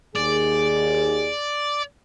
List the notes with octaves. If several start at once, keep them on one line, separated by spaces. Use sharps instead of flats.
D#2 G#4 D5